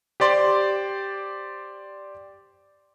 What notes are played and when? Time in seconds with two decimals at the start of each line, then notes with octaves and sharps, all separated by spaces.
0.20 G4 C5 D5 C6